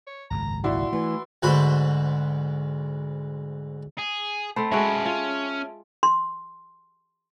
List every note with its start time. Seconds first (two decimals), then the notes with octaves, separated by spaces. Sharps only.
0.07 C#5
0.31 G#1 C#2 F#2 A#5
0.64 A#2 E4 F#4 D5 C6
0.93 E3 A3
1.43 D2 G#2 F#4 B4 C5 B5
3.99 G#4
4.56 A3 C4 C5 A5 B5
4.72 G#3 C#4 F#4 B4 C#5 E5 A5 D7
5.06 C#4 F4
6.03 C6